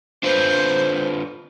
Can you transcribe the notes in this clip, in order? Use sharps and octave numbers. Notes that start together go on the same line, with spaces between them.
D4 F4 B4 C5